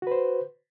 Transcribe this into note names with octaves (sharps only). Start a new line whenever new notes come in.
F#4 B4 C5